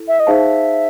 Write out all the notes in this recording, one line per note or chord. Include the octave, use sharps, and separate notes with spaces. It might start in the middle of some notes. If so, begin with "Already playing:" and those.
Already playing: E4 A4
E5
D#5
D#4 G#4 C5 E5 F5 A5